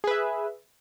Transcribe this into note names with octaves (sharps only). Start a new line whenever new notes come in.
G#4 B4 E5